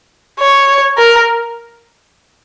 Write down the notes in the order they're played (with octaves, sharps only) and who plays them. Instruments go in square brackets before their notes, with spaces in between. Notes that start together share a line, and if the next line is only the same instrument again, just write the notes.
[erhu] C#5
A#4